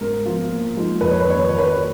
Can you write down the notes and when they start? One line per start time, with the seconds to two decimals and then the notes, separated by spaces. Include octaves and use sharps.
0.01 G#2 A#4
0.26 F3 B3 F4
0.51 A#2
0.76 F3 G#3 D#4
1.01 F2 B4
1.11 C#5
1.20 B4
1.26 D#3 A#3 C#4 C#5
1.40 B4
1.49 D#3 C#5
1.58 B4
1.69 C#5
1.76 F#3 A#3